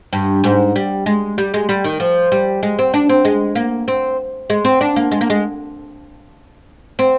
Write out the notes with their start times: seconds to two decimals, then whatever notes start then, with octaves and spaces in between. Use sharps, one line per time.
0.13 G2
0.44 G#2
0.76 G3
1.06 G#3
1.38 G3
1.54 G#3
1.69 G3
1.84 D#3
2.00 F3
2.32 G3
2.63 G#3
2.79 C4
2.94 D4
3.09 C4
3.25 G#3
3.55 A#3
3.88 C4
4.50 G#3
4.65 C4
4.81 D4
4.96 A#3
5.11 G#3
5.21 A#3
5.30 G#3
6.99 C4